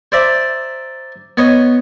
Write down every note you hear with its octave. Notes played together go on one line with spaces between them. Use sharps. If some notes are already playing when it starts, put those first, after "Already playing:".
C5 D5 E5 A#5
B3 C#5 D#5